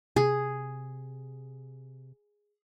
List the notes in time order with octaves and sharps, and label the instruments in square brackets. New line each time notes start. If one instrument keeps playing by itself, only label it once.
[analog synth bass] C3 [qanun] G#4